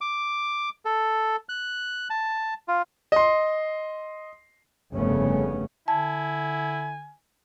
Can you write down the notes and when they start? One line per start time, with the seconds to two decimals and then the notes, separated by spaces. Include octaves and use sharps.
0.01 D6
0.85 A4
1.49 F#6
2.10 A5
2.68 F4
3.12 D#5 C6
4.93 F1 G2 C#3 A3 B3 C#4
5.88 D3 E4 G#5 A5